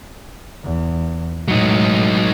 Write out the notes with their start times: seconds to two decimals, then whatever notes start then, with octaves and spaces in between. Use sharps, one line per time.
0.64 E2
1.48 A2 F#3 G#3 D#4